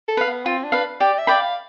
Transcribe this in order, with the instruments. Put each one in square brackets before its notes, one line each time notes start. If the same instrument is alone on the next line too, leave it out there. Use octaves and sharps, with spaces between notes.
[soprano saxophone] A4
[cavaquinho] B4 F5
[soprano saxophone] B3
[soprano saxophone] C4 [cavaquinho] F4
[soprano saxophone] D4
[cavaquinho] B4 F5
[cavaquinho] G4 [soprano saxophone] D5
[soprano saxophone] E5
[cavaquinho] D5 G5 B5
[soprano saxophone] F5